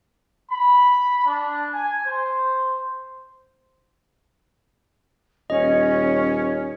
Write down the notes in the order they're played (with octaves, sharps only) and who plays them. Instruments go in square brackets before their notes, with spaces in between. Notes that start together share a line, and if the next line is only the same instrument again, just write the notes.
[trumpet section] B5
D4
G#5
C5
[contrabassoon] D#1 [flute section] C#4 [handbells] D#5